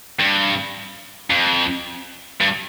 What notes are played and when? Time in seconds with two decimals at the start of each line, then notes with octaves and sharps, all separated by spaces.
0.20 G2
1.31 F2
2.41 G2